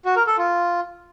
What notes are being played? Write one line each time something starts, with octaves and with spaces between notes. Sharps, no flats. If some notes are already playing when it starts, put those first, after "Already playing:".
F#4
A#4
A4
F4